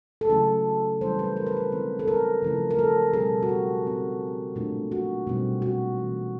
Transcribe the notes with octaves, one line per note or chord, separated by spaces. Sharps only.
A4
C#3 F#3 A3 C#4 E4 G#4
E3 G3 A#3 C#4 E4 C5
B4
A#4
B4
A#4
D#3 G#3 C4 E4
A4
A#4
C#3 F3 A3 C#4 E4
A#4
A4
B2 G3 C4 G#4
F#4
G4
G3 C4 D#4
A#2 F#3 A3 D4 F4
F#4
B2 G3 C4 D#4
F#4
E3 A3 C4